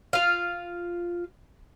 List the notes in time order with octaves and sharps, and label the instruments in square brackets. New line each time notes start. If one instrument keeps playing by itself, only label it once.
[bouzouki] F4 F5